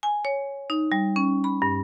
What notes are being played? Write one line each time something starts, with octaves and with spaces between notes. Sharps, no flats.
G#5
C#5
D#4
G3
C#4
B5
G2